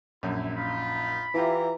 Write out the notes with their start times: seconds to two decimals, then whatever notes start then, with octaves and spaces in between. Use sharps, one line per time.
0.23 A#1 F#2 E4
0.57 D#4 F4 B5
1.34 E3 E4 F4 G4 A#5